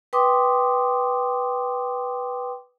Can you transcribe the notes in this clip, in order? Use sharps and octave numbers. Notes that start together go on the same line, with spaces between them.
B4 G5 C6 D6 D#6